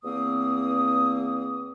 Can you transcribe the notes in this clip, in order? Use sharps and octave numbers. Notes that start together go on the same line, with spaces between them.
E2 A#3 C4 D#6